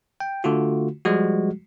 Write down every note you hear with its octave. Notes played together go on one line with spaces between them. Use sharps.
G5
D3 A3 F4 F#4
F3 G3 G#3 F#4